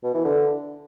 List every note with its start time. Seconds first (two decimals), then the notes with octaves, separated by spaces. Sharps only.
0.03 B2
0.14 E3
0.25 D3